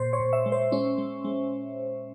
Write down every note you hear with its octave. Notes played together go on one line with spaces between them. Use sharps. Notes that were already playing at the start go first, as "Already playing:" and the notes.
Already playing: A#2 C5
C#5
A#2
E5
G#3
C5
G#3 C#4
G#3
G#3